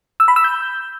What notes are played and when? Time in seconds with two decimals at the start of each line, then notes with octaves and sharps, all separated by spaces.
0.20 E6
0.28 B5
0.36 E6
0.44 G6